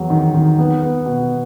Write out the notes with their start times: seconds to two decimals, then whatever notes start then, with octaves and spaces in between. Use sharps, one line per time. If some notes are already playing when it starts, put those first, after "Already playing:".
Already playing: E2 F#3
0.10 D#3
0.34 D#3
0.59 B3
0.82 B3
1.06 B2